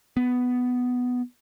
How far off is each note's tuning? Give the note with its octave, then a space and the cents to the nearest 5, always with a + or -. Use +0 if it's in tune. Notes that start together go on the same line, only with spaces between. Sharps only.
B3 +5